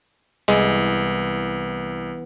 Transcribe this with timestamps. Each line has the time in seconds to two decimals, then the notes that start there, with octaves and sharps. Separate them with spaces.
0.48 C2 E3 G#3 B3